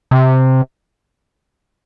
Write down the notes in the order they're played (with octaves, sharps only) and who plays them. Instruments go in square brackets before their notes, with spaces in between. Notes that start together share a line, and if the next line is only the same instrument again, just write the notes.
[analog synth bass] C3